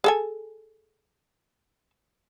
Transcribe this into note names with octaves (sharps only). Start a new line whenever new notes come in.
G#4 A4 G#5